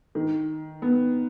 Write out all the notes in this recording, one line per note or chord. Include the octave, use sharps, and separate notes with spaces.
D#3
B3